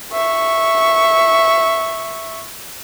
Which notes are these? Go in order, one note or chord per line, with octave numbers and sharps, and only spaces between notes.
E5 C#6